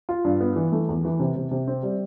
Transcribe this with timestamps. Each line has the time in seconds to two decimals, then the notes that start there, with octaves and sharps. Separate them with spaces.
0.09 F4
0.24 G2
0.41 B3
0.56 E3
0.72 A3
0.89 E2
1.05 E3
1.20 C3
1.36 C3
1.51 C3
1.68 C4
1.83 G3